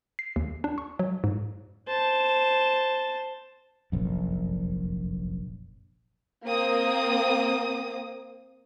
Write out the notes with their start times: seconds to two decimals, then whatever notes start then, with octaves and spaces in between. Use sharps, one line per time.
0.19 C7
0.36 D#2
0.64 D4
0.78 C#6
0.99 F#3
1.24 G#2
1.87 C5 A5
3.92 F1 A#1 F#2
6.46 A#3 C4 D#6